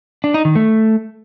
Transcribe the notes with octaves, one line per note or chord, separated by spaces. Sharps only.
D4
D#4
D#3
A3